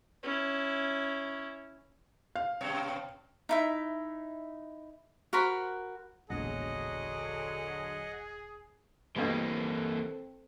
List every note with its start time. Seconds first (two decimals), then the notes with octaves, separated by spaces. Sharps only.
0.23 C#4 E4
2.35 F5
2.61 G2 B2 C#5
3.49 D#4 E4 E5
5.33 F#4 A#4 C5 B5
6.30 E1 A#1 D3 F#3 G#4 D#5 F#5
9.16 G2 B2 E3 G#3 A#3 C4 A4